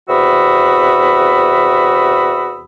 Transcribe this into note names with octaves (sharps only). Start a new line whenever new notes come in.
E2 C3 F#4 B5 D#6 E6